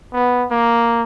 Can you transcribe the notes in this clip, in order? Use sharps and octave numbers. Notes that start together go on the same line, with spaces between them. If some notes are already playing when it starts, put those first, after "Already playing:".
B3
A#3